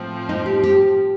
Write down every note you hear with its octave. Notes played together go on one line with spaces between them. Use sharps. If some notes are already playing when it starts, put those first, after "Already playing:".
Already playing: A2 F3 C4
D#4
G4
G4